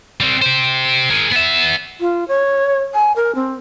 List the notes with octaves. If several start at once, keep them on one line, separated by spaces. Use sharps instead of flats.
G3 C4
G4 C5
G#4 A#4
B3 E5
F4
C#5
G#5
A#4
C4